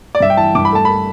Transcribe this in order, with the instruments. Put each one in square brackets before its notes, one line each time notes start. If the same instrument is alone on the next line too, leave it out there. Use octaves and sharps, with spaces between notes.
[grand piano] D5
G2 E5
G5
E3 A5
G2 D6
B5
A3 A5
A3 B5